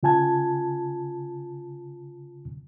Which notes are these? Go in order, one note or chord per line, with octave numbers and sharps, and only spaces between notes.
C#3 F4 G#5 A5 G#6